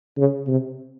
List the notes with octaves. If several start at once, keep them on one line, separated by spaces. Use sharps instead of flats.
C#3
C3